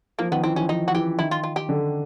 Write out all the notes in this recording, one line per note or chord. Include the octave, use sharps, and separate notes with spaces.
F3 A#3
D#3 B3
E3 C4
F3 C#4
F3 D#4
F#4
E3 G4
D#3 E4
F4
F4
G4
D3